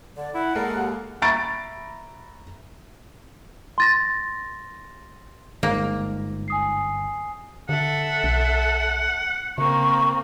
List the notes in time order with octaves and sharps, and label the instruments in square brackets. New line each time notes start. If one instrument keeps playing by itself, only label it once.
[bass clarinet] D3 [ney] D5
[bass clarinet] E4 [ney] F#5
[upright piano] G#3 A#3 A4 [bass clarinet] A#4
[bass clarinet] D#2
[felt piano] E5 A#5 B5 C#6 A6 D7
[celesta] C6 A6 A#6
[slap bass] G1 [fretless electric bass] G#2 [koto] A#3
[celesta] G#5 D#6 C7
[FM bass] D3 [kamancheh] A4 E5 [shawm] F#5
[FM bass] B1
[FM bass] C#3 [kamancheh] A#3 C4 [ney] C#6